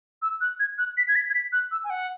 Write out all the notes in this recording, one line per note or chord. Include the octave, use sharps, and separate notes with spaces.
E6
F#6
G#6
F#6
B6
G#6
B6
G#6
B6
F#6
E6
G#5
F#5